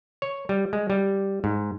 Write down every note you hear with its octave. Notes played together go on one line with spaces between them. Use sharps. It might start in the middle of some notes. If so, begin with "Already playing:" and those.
C#5
G3
G#3
G3
G#2